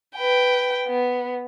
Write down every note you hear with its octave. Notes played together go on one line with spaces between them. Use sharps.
B4 G5
B3